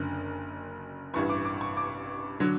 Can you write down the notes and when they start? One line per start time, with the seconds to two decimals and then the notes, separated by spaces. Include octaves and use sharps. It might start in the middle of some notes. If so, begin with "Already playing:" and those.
Already playing: F#1 F#2 D3
1.13 A1 G2 E3 C#6
1.29 D6
1.45 D6
1.61 C#6
1.77 D6
2.40 D3 F#3